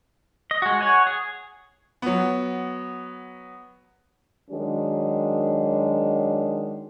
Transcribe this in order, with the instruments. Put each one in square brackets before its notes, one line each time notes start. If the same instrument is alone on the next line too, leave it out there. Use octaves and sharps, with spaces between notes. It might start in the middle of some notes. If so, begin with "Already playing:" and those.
[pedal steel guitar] D#5
G#3 F#4
C#5 F#5 G#5
G#4
[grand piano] F#3 B3
[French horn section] D#3 F#3 G#3 D4